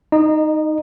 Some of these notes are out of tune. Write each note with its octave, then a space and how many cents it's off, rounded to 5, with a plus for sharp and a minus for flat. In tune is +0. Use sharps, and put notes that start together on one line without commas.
D#4 +0 D#5 -30